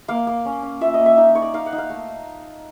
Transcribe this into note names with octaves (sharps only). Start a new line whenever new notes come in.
A#3 F5
A#3
C#4
C#4
F4 E5
D#5
A#3
E5
D#4
D#4 C#5
D5
D#4 F5
F#5
D#4
F5
A3